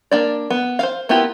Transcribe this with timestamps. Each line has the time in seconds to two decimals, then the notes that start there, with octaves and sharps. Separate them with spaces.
0.11 A#3 D4 D5
0.50 B3
0.79 C5 F5
1.09 A#3 B3 E4 F4 G4